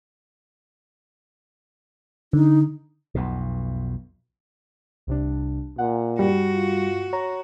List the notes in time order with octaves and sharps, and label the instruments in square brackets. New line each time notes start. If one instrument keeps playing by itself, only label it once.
[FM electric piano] D3 [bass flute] D#4
[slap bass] B1 F2 B2
[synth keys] C2 C3 D4
[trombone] A#2 [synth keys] F#5
[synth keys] G2 [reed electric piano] G3 [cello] F#4
[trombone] F4
[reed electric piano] C#5 A#5